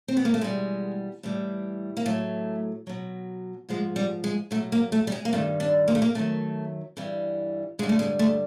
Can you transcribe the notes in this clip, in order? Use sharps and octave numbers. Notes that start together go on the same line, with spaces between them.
C4
B3
A#3
A3
E2 B2 G3 G#3
A2 E3 G3
A#3
A2 F#3 A3
B2 F#3
G#2 F3 G#3
G3
G#3
B2 F#3 A3
A#3
A3
G3
G#3
A#3
G2 D#3 G3 A3
D4
A#3
A3
A#3
F#2 D#3 F#3 A3
G2 E3 G3
G2 D3 G3 G#3
A3
G#3
A3